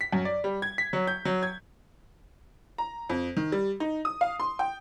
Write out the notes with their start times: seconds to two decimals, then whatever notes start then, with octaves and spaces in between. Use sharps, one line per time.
0.01 B6
0.13 F#2
0.25 D5
0.44 G3
0.62 G#6
0.78 B6
0.93 F#3
1.07 G6
1.25 F#3
1.43 G#6
2.78 A#5
3.09 F2
3.37 D#3
3.52 G3
3.80 D#4
4.05 D#6
4.21 F5
4.40 C6
4.59 G5